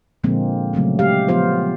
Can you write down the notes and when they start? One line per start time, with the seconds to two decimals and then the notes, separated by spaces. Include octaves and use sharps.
0.24 A#2 D3 F3 G#3 A#3 C4
0.73 C#3 F#3 A3 C4
0.99 G#3 G4 F5
1.28 F3 B3 F4 C5